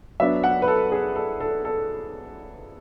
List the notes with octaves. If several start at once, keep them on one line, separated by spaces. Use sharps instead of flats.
F#3 B3 D4 E5
F#5
B4
A4
G#4
A4
A4
A4